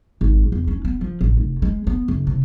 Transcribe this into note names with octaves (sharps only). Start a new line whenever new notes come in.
G#1
E2
C#4
B3
F3
A1
F1
G#3
B3
F#1
C3